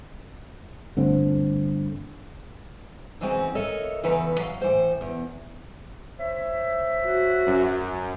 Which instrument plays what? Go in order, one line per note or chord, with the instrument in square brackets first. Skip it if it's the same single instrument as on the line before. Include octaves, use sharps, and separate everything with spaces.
[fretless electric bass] G1 D3 A3 C4
[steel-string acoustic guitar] C3 E3 F#3 G#3 C4 C#4
A4 A#4 C#5 D#5 E5
E2 C#3 E3 B4 E5 A#5
F#3 F5
A2 E3 C5
E2
[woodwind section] C5 C#5 E5
[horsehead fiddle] F#4
[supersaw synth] F#2